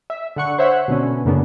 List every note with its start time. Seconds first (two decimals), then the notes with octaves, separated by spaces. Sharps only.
0.10 E5
0.36 D3 F#5 C#6
0.59 C5 C#5 E5 F#5
0.88 B2 D3 B3 C#4
1.25 F#2 C#3 A#3 B3 D4